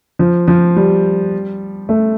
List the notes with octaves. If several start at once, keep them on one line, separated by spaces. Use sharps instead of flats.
F3
F3
G3
A3